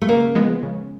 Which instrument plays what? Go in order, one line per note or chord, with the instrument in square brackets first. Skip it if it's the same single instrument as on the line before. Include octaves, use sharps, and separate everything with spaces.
[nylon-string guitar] A3
[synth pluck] C#3 [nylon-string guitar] A#3
[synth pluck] F3 G#3 B3
C#3